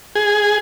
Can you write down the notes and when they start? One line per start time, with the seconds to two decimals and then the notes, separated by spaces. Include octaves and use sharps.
0.15 G#4